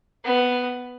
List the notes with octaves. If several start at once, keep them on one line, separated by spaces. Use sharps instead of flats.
B3